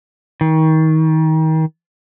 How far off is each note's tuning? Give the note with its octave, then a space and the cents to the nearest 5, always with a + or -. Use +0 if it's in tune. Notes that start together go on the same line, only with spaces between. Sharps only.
D#3 +30